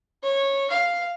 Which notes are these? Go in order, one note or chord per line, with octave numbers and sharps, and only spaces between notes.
C#5
F5